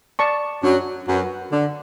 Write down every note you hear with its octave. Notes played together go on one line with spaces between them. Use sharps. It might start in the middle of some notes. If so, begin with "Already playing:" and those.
D5 A5 C#6
F#2 F#3 D4
F#2 F#3 F#4 B4
D3 D4